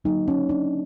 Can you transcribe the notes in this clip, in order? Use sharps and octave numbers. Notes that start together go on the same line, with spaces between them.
D3 F#3 A#3 D#4
C#4
D4